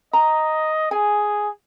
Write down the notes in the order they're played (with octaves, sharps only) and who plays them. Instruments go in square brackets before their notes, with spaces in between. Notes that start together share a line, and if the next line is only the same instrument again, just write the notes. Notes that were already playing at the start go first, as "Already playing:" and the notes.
[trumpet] D#5 [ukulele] A#5
[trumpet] G#4 [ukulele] G#5